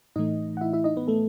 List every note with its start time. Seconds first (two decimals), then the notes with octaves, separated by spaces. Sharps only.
0.16 A2 E3 A3 D#4 D#5
0.57 F#5
0.61 E4 E5
0.73 E4 E5
0.84 D#4 D#5
0.97 B3 B4
1.08 A3 A4